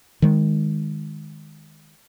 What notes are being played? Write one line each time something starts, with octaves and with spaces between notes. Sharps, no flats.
D#3 G#3